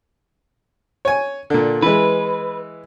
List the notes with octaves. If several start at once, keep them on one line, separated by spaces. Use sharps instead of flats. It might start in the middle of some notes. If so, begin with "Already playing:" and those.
C#5 G#5
A#2 D3
E3 G#3 B4